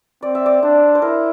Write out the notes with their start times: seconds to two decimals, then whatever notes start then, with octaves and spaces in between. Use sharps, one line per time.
0.22 C4 D5
0.35 E5
0.46 D5
0.63 D4 C5
0.95 C5
1.02 E4 A#4